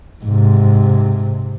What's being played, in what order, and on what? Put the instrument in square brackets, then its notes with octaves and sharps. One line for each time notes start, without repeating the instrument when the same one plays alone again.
[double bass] G#2 C3